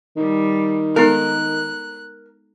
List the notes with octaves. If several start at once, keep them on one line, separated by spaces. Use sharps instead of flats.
D#3 G3
G#3 B3 D#4 A#4 F#6